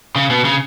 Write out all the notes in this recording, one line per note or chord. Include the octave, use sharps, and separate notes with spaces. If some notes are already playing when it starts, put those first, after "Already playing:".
C#3
B2
C#3